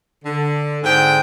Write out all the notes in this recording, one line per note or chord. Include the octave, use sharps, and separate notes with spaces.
D3
G#2 D3 C4 G5